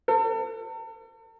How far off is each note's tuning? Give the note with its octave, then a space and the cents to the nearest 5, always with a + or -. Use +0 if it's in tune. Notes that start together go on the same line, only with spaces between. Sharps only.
A4 +40